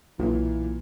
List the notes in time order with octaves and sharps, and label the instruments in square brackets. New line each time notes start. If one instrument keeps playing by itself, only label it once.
[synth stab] B1 [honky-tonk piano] A#2 [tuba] E3